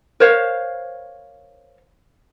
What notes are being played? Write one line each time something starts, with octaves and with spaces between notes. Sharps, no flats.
A#4 C5 C#5 F5